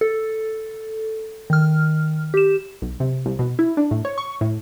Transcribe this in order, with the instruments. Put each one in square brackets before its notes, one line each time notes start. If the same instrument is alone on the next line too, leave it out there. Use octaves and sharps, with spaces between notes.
[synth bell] A4
D#3 F6
G4 E7
[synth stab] B1
C3
C2
B2
E4
D4
A2
C#5
C#6
A2